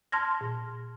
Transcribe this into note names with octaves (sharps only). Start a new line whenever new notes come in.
A5 C6 F6 G#6 A#6
A#2